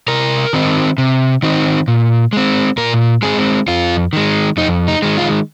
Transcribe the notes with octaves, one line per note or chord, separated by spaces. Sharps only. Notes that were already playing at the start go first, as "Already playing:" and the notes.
C3 A#4
D#3 C4 D#4
C3
D#3 C4 D#4
A#2
G#3 C4
A#2 A#4
G#3 C4 G#4
F2 F4
D#3 G#3
F2 D#4
D#4
D#3 G#3
F4